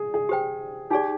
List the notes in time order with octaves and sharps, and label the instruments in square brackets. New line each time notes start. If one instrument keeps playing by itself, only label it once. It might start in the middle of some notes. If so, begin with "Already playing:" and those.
Already playing: [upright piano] G#4
G#4
[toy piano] G4 C5 G5
[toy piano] D#4 G#4 D5 [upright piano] G4